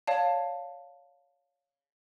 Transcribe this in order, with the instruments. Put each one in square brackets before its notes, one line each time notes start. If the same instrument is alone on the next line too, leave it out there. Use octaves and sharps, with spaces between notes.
[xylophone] C#5 D5 F5 A5